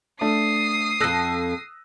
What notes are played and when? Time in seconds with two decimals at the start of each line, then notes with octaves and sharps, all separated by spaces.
0.21 A3 D4 D#6 C7
1.01 F2 A4 E6 F#6 A#6